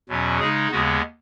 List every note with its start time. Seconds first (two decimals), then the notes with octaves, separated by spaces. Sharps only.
0.09 E2 B2 F#3 C#4
0.39 C#3 G#3 D#4 G#4
0.71 D#2 C#3 G#3 B3 F#4